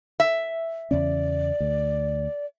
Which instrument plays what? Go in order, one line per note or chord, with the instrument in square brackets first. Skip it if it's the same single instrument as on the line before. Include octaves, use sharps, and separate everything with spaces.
[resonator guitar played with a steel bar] E5
[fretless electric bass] E2 C#3 C#4 [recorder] D5
[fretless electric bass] D2